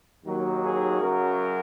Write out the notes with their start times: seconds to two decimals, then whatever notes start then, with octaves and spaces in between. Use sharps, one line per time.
0.24 D#2 D#3 F#3 A#3
0.62 G#4
1.00 F#2 C#3 F#3 A#4